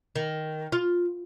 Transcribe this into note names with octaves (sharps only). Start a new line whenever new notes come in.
D#3
F4